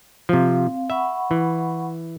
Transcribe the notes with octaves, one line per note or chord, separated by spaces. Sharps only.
C3 F3 C4 F5
E5 F#5 B5 C#6
E3